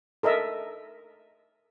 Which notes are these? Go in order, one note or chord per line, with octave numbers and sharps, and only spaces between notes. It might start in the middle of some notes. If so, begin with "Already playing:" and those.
A4 A#4 D#5 E5